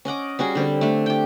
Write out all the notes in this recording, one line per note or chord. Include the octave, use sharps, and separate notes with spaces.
C#4 D#5 F#5 D6
G3 C#4 F#4 G#4
D3 G3 C4
A3 D4
G4 G5